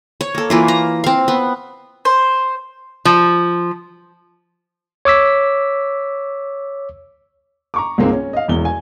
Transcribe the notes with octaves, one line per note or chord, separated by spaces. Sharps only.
C#5
A#3 A4
E3 A#3 F4
A#5
C4 F5
B3
C5
F3
C#5 D6 E6 B6
A#5 C#6 D6
C#2 G#2 G#3 A#3 C4
C#4
D#5 F5
E1 E2 G7
G#5